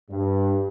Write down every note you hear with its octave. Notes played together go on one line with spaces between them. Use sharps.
G2